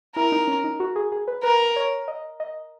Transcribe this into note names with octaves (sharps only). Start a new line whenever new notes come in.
E4 A#4
D#4
C#4
D#4
F#4
G#4
G#4
B4
A#4 B4
C#5
D#5
D#5